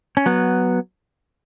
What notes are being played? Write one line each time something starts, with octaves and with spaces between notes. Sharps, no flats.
C#4
F#3 B3